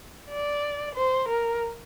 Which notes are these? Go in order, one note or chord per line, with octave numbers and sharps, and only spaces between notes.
D5
C5
A#4